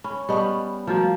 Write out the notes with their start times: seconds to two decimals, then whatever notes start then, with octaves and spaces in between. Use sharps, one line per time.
0.04 C#4 B5
0.29 G3 B3 D#5 A5 C#6
0.87 F3 G3 A3 A#3 F#4